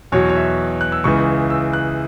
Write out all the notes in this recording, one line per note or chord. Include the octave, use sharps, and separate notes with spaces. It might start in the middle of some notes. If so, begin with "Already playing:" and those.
E2 B2 F#3 C#5
C#5
E5
F#6
E6
C#2 C#3 E3 C#6
E6
F#6